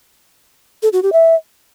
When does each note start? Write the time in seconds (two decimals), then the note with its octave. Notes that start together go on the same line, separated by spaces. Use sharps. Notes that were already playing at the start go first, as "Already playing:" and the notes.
0.83 A4
0.93 F#4
1.03 G4
1.13 E5